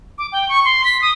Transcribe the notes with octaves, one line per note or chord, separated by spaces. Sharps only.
D6
G5
C#6
C6
B6
D#6